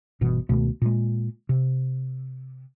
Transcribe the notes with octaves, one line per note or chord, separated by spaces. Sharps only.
G1 B2 E3
C#2 B2 D#3 A3
A#2 G#3
C3